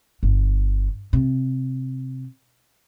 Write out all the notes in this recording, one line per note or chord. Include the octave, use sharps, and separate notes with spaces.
G1
C3